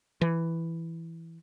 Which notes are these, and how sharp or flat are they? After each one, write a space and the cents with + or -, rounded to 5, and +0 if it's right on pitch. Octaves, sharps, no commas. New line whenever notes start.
E3 +5